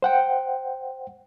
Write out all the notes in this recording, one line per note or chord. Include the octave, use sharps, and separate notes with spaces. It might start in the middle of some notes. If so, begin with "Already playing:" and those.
C5 F#5 G5